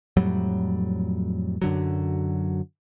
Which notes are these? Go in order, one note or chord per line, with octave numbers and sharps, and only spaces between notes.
F2 A2 F#3 G3
F#2 D3 F#3